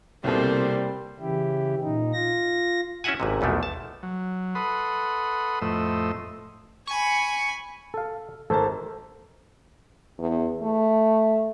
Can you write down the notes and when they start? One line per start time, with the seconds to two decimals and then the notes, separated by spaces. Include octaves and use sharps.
0.24 C2 B2 G3 A#3 C4 A4 C5
1.20 C#3 E3 E4 G4
1.82 A#2 D#4
2.13 F4 A#6
3.04 C#4 E4 F#4 E5 F#5 G#5
3.20 G#1 G#2 C3
3.41 B1 E2 E3 F3 A3
3.63 A5
4.03 F#3
4.55 A4 B4 F#5 B5 C6 D#6
5.62 F2 A2 A3 C5 D#5 E6
6.87 G#5 B5 C#6
7.94 A4 F5
8.50 G#1 A4 A#4 C5 A5
10.19 E2
10.62 A3